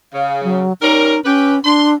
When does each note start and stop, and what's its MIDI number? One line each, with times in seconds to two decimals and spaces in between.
0.13 0.64 49
0.13 0.43 77
0.44 0.73 54
0.81 1.15 55
0.81 1.15 61
0.81 1.21 63
0.81 1.15 70
1.25 1.62 61
1.25 1.54 67
1.25 1.54 71
1.64 1.95 62
1.64 1.88 84